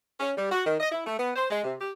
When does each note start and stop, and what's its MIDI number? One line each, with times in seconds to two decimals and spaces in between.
0.19 0.31 61
0.36 0.50 55
0.51 0.63 66
0.65 0.76 51
0.79 0.90 75
0.92 1.02 64
1.05 1.16 57
1.18 1.30 59
1.36 1.47 72
1.49 1.62 56
1.63 1.74 48
1.80 1.91 67